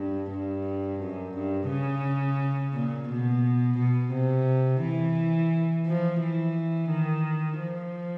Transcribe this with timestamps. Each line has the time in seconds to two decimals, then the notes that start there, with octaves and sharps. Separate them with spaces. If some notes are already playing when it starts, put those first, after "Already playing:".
Already playing: G2
0.30 G2
1.00 F#2
1.34 G2
1.69 C#3
2.73 A#2
3.08 B2
3.78 B2
4.13 C3
4.82 E3
5.86 F3
6.21 E3
6.90 D#3
7.60 F3